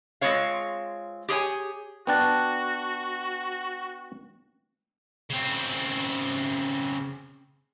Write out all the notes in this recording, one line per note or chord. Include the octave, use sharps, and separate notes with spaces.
G#3 C4 F4 C#5 F5
G4 G#4 C#5 G#5
B3 D4 F#4 G5 A5 F#6
C#3 C4